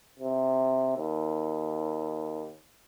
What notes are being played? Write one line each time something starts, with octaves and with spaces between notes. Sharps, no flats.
C3
D#2